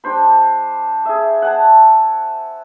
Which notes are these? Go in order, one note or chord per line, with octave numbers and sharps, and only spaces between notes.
G3 D4 C5 B5
G#4 E5
F#5 G#5 A5